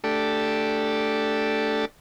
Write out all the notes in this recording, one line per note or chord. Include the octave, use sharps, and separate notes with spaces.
A3 D4 G4 A4